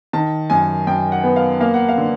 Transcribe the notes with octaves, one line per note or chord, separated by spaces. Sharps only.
D#3 A5
F#2 G#5
F#2 G5
F#5
B3
F5
A#3 F5
F#5
F5
D3